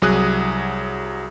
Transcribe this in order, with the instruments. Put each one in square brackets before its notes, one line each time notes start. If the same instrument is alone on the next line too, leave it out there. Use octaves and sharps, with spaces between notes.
[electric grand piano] C2 F#3 G#4 D#6 F#6